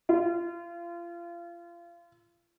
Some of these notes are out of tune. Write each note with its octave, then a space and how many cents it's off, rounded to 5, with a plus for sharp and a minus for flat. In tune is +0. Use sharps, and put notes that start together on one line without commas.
F4 -30